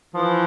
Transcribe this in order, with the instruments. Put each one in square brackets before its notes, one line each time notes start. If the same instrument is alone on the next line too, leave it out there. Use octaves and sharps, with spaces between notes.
[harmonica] E3 [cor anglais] F3